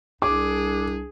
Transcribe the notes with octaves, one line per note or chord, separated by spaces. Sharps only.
C2 D4 G#4 D6